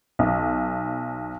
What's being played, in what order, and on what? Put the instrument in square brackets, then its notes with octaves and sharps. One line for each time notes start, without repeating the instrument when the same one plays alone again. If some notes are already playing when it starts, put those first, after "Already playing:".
[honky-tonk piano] B1